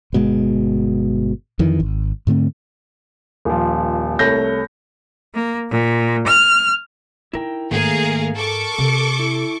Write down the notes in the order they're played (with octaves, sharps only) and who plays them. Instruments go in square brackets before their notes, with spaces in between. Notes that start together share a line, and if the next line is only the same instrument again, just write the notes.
[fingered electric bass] G1 B2 G#3
F2 D#3 E3
G#1
G#2 D3 A3 C4
[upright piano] D#1 F3
C2 A3 C#5 G6 A#6
[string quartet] A#3
A#2
F6
[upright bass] D#4 [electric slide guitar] E4 A#4 G5
[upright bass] G#2 [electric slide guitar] D#3 A3 A#3 [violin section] G#4 A#4 F5
[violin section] A4 C#6 D6 [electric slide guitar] A#4
[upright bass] C3
[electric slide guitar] E4